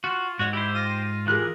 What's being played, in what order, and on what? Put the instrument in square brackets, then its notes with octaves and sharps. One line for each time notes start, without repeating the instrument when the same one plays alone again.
[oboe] F4 [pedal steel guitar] F#4
[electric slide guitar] G#2 D#5 [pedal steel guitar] F#4 C#5
[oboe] E4 [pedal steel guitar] G4 C5
[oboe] F4 [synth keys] A#6 D#7
[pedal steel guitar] E3 F#6 [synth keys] F4 G4 G#4 [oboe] A#4